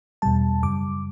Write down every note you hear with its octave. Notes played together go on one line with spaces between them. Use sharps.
E2 B2 G3 A5
F#2 C#3 G3 D6